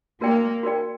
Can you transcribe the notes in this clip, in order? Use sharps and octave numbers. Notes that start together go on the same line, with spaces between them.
A#3 F#4 A#4 D5 G5
F#4 A#4 D5 G5